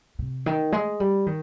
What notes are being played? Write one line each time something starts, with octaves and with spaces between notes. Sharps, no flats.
C3
D#3
G#3
G3
D#3